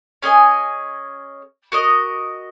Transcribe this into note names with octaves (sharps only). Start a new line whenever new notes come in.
C#4 G#4 D#5 G#5
F#4 A#4 D#5